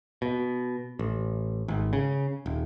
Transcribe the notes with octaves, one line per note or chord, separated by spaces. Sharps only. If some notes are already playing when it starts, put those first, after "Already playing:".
B2
A1
G#1
C#3
D#1